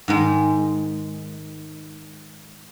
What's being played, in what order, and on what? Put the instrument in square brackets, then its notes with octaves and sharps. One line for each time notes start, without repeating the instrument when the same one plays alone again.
[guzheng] G#2 D#3 G#3